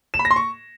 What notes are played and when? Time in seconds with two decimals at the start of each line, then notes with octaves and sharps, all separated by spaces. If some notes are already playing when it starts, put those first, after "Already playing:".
0.14 E7
0.19 B5
0.25 A#6
0.31 C6
0.36 C#6